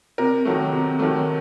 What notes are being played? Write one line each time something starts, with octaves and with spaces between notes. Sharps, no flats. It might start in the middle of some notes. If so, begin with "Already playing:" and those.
C3 A#4
D#3 F#3 A3
C3
D#3 F#3 A3